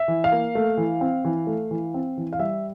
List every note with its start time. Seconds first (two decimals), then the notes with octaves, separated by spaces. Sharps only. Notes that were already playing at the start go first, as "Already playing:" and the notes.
Already playing: E5
0.08 E3
0.24 F5
0.32 A#3
0.55 A3
0.78 E3
1.01 C4
1.25 E3
1.47 A3
1.71 E3
1.94 C4
2.17 E3
2.33 F5
2.39 G3 E5